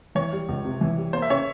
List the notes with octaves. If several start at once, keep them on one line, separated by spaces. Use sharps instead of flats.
E3 C#5
G3
C#2
C3
E3
G3
A#3 C5
E5
C#3 C#5